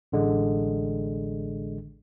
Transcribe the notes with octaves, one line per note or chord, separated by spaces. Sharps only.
A1 D3 G#3